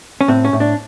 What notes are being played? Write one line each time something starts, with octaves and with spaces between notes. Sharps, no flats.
C#4
A2 C4
C#4
A2
D4